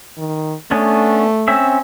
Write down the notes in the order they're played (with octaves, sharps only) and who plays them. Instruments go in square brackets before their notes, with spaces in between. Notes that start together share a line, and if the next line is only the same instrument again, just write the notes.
[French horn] D#3
[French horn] A3 [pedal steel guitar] B3 C#4 D4
[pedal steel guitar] C4 C#4 E5